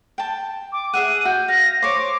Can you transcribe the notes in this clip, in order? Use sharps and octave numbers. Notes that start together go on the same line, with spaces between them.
G5 A5
D6
G#4 E5 F#5 D#7
F#4 G6
F5 A#6
C5 C#5 D6